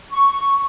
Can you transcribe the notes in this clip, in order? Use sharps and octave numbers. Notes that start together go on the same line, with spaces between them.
C#6